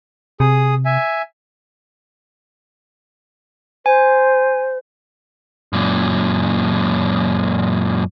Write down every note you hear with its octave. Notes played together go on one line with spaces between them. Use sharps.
C3 G#4 D#6
E5 G#5
C5 G#5
F#2 A#2